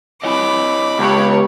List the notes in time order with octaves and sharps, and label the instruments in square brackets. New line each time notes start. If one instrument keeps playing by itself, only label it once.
[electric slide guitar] E4 C#5 D#5 [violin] B5 D6
[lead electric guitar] C#2 [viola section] B3 G4 C#5